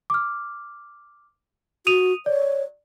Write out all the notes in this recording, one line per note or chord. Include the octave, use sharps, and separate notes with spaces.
D6 F6
F#4 D#6 D#7 F7
C#5 D5